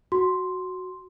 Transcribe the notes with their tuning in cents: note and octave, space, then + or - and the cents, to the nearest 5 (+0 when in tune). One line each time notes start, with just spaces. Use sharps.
F#4 +0 C6 +0